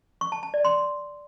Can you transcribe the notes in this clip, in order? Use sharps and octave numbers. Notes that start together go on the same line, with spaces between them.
C#6
A5
A5
D5
C6